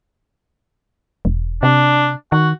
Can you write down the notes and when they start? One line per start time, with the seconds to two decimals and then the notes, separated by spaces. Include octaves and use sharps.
1.25 E1
1.63 C3 D4
2.32 D#3 F#4